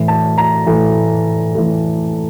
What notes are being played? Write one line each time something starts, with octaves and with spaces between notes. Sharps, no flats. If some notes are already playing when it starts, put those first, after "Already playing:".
Already playing: A2 E3 A3
A5
A#5
A2 E3 A3
A2 E3 A3